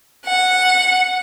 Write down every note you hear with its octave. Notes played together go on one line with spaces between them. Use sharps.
F#5